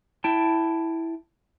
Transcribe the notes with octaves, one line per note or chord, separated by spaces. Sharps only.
E4 G5 A5